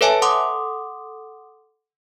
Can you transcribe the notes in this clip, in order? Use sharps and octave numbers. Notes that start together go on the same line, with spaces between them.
A4 B4 C#5 E5 G#5 A5
A4 F#5 C6 D6 D#6